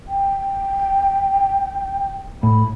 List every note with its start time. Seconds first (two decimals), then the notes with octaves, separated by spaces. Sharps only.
0.08 G5
2.43 A2 B5